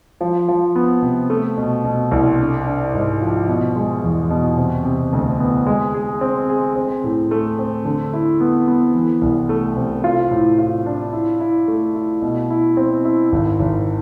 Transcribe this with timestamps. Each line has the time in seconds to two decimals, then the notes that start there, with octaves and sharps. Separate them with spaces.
0.21 F3
0.48 F3
0.75 B3
1.02 C3
1.30 A3
1.57 B2
1.84 B2
2.11 C2
2.39 D4
2.66 D4
2.94 G#2
3.21 F3
3.48 B2
3.76 G#3
4.03 E2
4.30 B2
4.57 C3
4.85 C3
5.13 D2
5.40 B3
5.67 G#3
5.94 G#4
6.21 C4
6.49 G#4
6.76 C4
7.04 A2
7.31 A3
7.59 C4
7.85 D3
8.13 E4
8.40 B3
8.67 B3
8.95 E3
9.21 C2
9.49 A3
9.77 C3
10.04 F4
10.31 A2
10.59 F4
10.86 D4
11.13 E4
11.40 E4
11.68 A3
11.95 E4
12.22 B2
12.50 E4
12.77 C4
13.05 E4
13.32 G#1
13.59 G#1